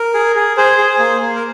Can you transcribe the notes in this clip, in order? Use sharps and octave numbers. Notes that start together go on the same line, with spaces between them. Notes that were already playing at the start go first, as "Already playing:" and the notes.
Already playing: A#4
G#4
G#4
G#4 C5
G#4
A#3
A#3
A#4